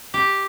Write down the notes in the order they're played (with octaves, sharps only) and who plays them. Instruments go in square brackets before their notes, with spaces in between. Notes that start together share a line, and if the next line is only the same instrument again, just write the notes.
[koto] G4